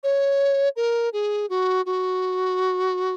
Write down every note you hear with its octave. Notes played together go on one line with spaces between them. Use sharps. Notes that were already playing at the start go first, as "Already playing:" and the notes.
C#5
A#4
G#4
F#4
F#4